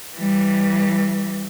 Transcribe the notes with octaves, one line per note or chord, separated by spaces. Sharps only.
E3 G3